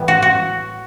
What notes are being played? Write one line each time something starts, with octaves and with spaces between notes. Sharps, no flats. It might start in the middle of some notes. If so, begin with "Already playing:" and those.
Already playing: A2 E3 G3 B3
F#4
F#4